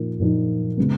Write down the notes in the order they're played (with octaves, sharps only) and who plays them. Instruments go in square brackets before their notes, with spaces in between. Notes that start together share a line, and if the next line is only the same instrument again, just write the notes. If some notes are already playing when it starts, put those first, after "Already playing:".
Already playing: [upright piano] A#2 F3 A#3 D#4
A#2 F3 A#3 D#4
C#3 G#3 B3